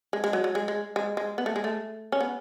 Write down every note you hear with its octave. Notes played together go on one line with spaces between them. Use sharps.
G#3
G#3
F#3
F#3
G#3
G#3
G#3
G#3
B3
A3
G#3
A3
C#4
B3